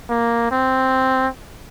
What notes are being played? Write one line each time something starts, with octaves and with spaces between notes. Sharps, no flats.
A#3
C4